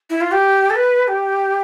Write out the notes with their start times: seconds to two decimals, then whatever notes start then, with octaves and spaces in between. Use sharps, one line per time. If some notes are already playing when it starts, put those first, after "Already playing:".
0.10 E4
0.21 F4
0.31 G4
0.70 A4
0.75 B4
1.08 G4